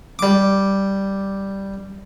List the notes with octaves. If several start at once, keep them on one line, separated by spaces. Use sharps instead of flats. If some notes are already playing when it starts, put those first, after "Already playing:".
G3 D6